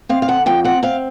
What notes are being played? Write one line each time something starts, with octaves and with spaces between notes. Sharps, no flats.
C4 F5
F5
D3 F#5
F2 G5
C4 F#5
C4 F5